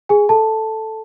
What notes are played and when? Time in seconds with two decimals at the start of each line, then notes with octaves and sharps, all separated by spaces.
0.09 G#4 G#5
0.29 A4 A5